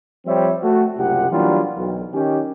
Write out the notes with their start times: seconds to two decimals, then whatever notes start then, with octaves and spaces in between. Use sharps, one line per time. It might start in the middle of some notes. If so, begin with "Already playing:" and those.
0.26 F3 G3 C4 C5 C#5 E5
0.63 A3 F#4 A4
0.97 F#1 C2 C3 F4 G4 F#5
1.31 E3 F#3 G3 A#3 D4 F4
1.76 B1
2.13 D#3 C#4 G4